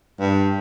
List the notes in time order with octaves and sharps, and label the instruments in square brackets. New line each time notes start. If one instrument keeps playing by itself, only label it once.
[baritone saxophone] G2